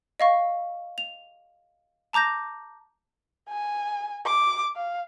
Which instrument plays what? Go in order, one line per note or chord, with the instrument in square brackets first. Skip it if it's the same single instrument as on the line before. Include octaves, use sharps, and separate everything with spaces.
[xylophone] D#5 F5 C#6
F7
A5 A#5 D6 G6 A#6
[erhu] G#5
D6
F5